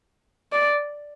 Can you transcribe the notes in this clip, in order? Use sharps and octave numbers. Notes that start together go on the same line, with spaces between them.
D5